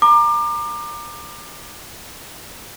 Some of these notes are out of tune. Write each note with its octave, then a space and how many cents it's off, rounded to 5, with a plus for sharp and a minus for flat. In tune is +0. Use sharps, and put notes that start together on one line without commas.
A#5 +0 D6 +30